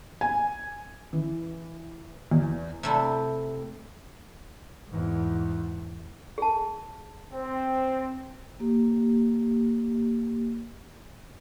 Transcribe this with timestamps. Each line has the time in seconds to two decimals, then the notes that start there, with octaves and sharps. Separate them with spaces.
0.21 G#5
1.13 E3
2.31 E2
2.83 C3 A3 E4
4.89 E2 G#2
6.38 G#4 A5
7.32 C4
8.60 A#3 G4